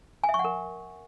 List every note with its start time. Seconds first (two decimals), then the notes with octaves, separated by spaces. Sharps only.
0.24 G#5
0.29 E5
0.34 C#6
0.39 F#5
0.45 A#4